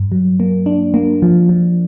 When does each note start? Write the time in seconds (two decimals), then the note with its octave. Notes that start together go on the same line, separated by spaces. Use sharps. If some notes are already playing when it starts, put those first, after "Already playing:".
Already playing: G2
0.12 F#3
0.40 A#3
0.66 D4
0.94 A#3
1.22 F3
1.49 F3